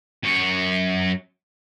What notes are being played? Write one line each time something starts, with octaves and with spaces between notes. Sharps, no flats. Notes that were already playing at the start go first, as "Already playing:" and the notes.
F#2 C#5